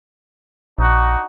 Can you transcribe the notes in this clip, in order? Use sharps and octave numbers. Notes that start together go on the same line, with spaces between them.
A#1 D4 D#4 F#4